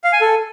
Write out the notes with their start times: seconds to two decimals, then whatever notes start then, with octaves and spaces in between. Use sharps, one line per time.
0.04 F5
0.13 G#5
0.21 A4